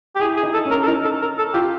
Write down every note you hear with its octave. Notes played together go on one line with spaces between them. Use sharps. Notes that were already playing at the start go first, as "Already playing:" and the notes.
G4
E4 G#4
G#4
D#4
A4
C#4
A#4
A4
D#4 A#4
A4
A#4
A4
F4 G4